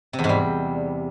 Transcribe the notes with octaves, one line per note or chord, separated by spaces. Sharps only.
C3
E2
G#2
G3